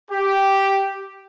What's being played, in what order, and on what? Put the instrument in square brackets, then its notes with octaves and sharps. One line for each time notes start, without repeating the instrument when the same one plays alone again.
[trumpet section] G4